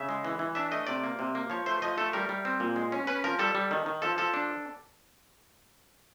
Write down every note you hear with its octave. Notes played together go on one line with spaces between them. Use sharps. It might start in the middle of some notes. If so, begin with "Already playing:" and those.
Already playing: C#3 E5
G#3
E3
E3
D4 E5
A3 D#5
C3 D5
A#3
C3
A#3
F3 C#5
A3 C5
F3 D#5
A3 A4
G3 A#4
G3
C4
A#2
G#3
C#4
C#4 B4
F3 A#4
G3 A4
G3
D#3
D#3
F3 A4
F3 A4
D4